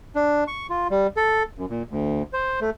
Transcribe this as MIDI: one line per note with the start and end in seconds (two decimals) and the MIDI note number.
0.15 0.44 62
0.47 0.67 85
0.70 0.87 65
0.91 1.07 55
1.16 1.43 69
1.58 1.66 42
1.70 1.83 46
1.91 2.22 38
2.33 2.60 72
2.61 2.70 57